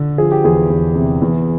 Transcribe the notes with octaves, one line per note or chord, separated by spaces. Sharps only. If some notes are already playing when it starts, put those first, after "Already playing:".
Already playing: D3
F3 G#4
G4
E2 G#4
E2
C3
E2